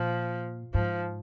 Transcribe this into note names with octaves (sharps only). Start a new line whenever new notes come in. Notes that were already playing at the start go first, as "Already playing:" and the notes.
Already playing: A#2 F3
G#2 F3